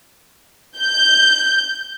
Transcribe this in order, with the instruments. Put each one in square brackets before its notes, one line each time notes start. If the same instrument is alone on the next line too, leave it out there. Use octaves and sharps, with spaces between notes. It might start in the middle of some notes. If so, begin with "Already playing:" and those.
[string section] G6